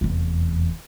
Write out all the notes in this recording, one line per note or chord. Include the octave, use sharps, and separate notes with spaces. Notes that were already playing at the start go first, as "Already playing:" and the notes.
F1 E2